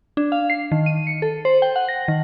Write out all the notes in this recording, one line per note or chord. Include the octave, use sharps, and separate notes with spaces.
D4
F5
C7
D#3
D#7
C#7
A4
C5
G5
F#5
A#6
D#3